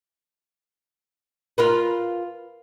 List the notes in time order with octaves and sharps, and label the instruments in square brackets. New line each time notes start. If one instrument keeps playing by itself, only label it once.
[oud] F4 A#4 B4